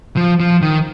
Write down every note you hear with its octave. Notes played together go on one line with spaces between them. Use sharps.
F3
F3
D#3